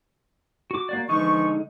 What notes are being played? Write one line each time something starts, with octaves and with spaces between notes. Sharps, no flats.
F#4 D6
A#3 F#4 D5
D3 E3 F3 G#3 D#4 C#6